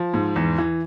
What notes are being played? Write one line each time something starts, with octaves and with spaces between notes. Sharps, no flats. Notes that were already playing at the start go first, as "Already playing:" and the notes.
Already playing: F3
G#2
E2
E3